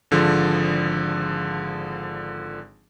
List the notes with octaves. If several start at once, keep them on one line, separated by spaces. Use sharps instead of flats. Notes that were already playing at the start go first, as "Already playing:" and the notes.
G#1 D3 F3 G#4